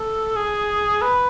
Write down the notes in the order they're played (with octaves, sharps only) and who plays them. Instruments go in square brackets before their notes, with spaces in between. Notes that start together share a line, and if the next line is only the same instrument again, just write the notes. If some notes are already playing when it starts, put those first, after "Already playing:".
Already playing: [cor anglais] A4
G#4
B4